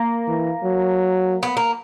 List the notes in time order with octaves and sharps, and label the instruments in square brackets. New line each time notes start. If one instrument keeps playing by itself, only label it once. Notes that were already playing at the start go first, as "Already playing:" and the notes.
Already playing: [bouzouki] A#3
[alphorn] E3
F#3
[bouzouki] B3
A#3